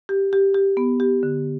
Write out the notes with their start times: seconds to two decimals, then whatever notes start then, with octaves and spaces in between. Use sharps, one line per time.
0.09 G4
0.33 G4
0.54 G4
0.77 B3
1.00 G4
1.23 D3